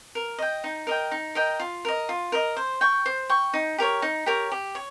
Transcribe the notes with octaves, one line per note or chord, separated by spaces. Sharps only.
A#4
D#5 G5
D#4
A#4 D#5 G5
D#4
A#4 D#5 G5
F4
A#4 D#5
F4
A#4 D#5
C5
G5 C#6
C5
G5 C#6
D#4
G4 A#4 C#5
D#4
G4 A#4 C#5
G4
C#5